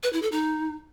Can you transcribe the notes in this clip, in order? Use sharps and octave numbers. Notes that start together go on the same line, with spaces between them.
B4
E4
A4
D#4